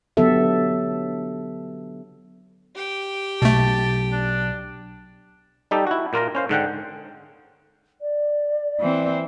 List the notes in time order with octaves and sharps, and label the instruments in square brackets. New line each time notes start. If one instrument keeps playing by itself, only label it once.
[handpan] D3 F#3 B3 G4 A4 E5
[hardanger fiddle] G4 G5
[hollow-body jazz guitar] B1 [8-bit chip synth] B2 A3 [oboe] A5
[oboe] D4
[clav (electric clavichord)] G3 D#4 G4 A4
E4 F#4
A#2 A#3 F4 A#4 A#5
C#4 C5 F5
G#2 D3 F#5 G5
[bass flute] D5
[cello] E3 C4